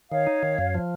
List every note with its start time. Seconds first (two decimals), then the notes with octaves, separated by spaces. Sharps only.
0.11 D#3 C#5 F5
0.27 D#4
0.43 D#3
0.58 F#2
0.74 F3